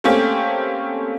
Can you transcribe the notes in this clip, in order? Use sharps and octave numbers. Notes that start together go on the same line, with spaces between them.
A3 A#3 C4 C#4 G4